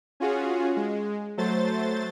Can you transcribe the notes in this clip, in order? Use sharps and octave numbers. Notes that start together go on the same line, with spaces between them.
C#4 F4 F#4 G#4
G#3
F#3 A3 C5 A6